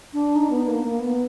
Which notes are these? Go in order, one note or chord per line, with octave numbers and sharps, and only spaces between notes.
D4
D#4
B3
A#3
A#3
B3